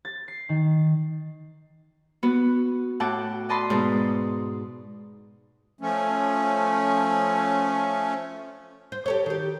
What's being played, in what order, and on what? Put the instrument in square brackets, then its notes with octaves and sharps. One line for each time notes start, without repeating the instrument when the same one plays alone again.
[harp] A6
C7
D#3
B3 F#4
A2 F#4 F#5 G5 A5 D6
D5 D#5 A5 B5 C6
G#2 B2
[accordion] F3 A3 C#4
[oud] C5
G4 A4 C#5
D#3 G4